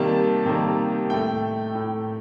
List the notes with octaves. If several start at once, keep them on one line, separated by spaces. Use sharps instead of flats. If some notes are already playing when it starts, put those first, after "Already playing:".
Already playing: C3 D#3 G3 A#3 A5
C3 D#3 G3 A#3
A2 A3 G5
A2 A3